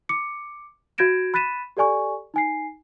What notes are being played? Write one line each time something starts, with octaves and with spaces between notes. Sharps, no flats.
D6 C#7
F#4 G6 G#6 A#6 D7 E7
B5 F#6 A6 B6 D#7 E7
G4 A4 D5 G#5 C#6
D#4 G#5 C7